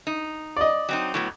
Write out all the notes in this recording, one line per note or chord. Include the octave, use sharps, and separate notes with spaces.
D#4
D5 D#5
F#3 C4 D#4
A2 F#3 B3